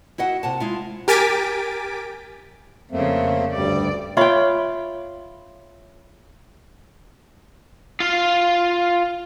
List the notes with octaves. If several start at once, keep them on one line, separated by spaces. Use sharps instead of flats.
E4 F#4 D#5 F#5
C3 F#5 A5
G#3 E4 F4
G4 A#4 G#5 A6 B6 D7
F2 C#3 A3 A#3 C4
D2 G2 G3 D5
F4 C#5 E5 G5 B5
F4 F5